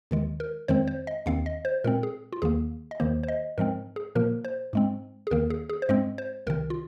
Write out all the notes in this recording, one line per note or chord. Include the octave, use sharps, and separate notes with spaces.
D#2 D#3 G#3
A#4
F2 D#3 G#3 C4 C5
C5
D#5
D#2 D#3 C4 F5
D#5
C5
A#2 G#3 C4 A#4
G#4
F4
D#2 D#3 A#3 G#4
D#5
D#2 D#3 A#3 C5
C5
D#5
G#2 F3 G#3 C4 A#4
G#4
A#2 F3 A#3 A#4
C5
G#2 G#3 C4
G#4
D#2 D#3 A#3 A#4
G#4
G#4
C5
G#2 G#3 C4 D#5
C5
C2 C3 D#3 A#4
F4